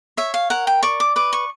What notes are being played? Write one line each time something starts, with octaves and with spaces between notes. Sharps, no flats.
C#5 E5
F5
A#4 F#5
G5
D5 C#6
D6
B4 D6
C#6